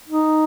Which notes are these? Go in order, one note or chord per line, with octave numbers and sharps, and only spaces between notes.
D#4